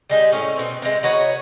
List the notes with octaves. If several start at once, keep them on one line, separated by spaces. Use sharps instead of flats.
G3 G#3 D#4
A2 C#4
B2 C4
C3 G#3
D#4 F#4 B4 C#5